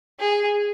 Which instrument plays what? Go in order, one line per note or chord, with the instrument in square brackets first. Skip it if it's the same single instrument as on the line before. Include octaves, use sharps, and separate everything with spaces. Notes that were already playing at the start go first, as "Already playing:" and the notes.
[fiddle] G#4